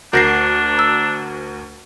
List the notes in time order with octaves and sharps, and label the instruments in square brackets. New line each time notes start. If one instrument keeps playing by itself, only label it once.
[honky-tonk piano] D2 F#4 A#4 [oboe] D4 [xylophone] G6 A#6 C7
[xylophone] A#5 E6